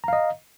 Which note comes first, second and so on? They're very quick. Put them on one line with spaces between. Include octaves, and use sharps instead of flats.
A#5 F5 D#5